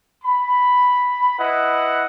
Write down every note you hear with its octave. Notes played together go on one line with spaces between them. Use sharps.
B5
E4 B4 D#5 F#5